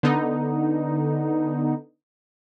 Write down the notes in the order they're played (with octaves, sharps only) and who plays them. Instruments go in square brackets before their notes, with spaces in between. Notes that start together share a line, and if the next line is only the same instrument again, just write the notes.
[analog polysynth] D3 B3 D#4